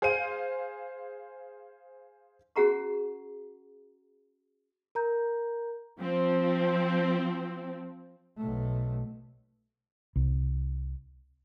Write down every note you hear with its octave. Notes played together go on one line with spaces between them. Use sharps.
G#4 C5 F5 G6 D#7
C#4 F#4 G#4 F#5 A#5 C#6
A#4 A#5 G6
F3 C4
B1 A3
C2